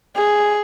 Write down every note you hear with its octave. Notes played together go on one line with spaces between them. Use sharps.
G#4